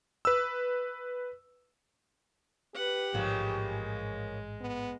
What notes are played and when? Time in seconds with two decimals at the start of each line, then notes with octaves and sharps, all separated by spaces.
0.25 B4 E6
2.75 G4 B4 F#5
3.14 A1 G#2 C#3 F3 G#3 A#3
4.61 B3